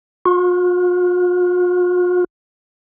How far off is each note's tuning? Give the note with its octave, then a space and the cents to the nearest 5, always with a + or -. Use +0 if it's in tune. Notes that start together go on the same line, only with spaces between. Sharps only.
F4 +45